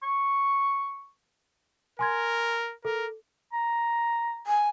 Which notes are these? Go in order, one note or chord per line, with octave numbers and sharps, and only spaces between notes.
C#6
A#4 G#5 C6 G#6
A4 A#4
A#5
G#5